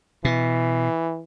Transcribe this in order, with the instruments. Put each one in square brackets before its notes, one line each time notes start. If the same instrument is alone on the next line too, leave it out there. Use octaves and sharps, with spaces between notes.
[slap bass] B2 [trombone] E3